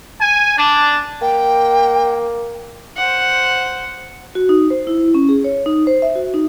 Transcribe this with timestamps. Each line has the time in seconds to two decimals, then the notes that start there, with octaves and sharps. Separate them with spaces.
0.19 G#5
0.56 D4
1.21 A#3 G5
2.97 C5 F#5
4.35 F#4
4.49 D#4
4.70 C5
4.87 E4
5.14 C#4
5.29 G#4
5.44 C#5
5.66 D#4
5.87 C5
6.02 E5
6.15 F#4
6.34 D#4